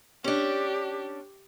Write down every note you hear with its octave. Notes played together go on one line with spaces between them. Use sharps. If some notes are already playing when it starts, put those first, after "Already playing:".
C#4 D4 G4